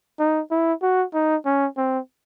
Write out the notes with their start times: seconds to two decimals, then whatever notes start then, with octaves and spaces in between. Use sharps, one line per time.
0.19 D#4
0.51 E4
0.82 F#4
1.14 D#4
1.45 C#4
1.77 C4